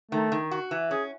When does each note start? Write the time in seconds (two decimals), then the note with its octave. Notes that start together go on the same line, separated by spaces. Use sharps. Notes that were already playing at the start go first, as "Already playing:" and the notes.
0.11 D#3 A3
0.32 D#3
0.51 F#4
0.71 E3
0.91 C#4 G#4